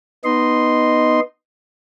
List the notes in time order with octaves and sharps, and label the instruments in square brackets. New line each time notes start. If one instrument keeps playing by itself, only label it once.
[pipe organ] B3 D#4 D#5 C6